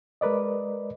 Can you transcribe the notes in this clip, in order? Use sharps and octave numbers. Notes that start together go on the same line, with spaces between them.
G#3 A#4 B4 D5 D#5